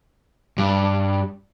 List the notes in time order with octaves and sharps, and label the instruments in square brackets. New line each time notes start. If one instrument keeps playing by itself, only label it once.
[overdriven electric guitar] G2